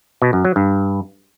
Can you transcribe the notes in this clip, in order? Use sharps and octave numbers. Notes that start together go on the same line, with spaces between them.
B2
F#2
F#3
G2